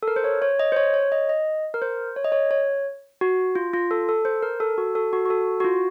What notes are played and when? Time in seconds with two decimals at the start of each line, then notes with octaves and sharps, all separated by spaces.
0.03 A4
0.08 A#4
0.16 C5
0.24 C#5
0.42 C#5
0.59 D#5
0.72 C5
0.76 C#5
0.94 C#5
1.12 D#5
1.29 D#5
1.74 A#4
1.82 C5
2.16 C#5
2.25 D#5
2.32 C#5
2.51 C#5
3.21 F#4
3.55 F4
3.73 F4
3.91 A4
4.09 A4
4.25 C5
4.43 A#4
4.60 A4
4.78 F#4
4.95 A4
5.13 F#4
5.26 F#4
5.30 A4
5.60 F#4
5.64 F4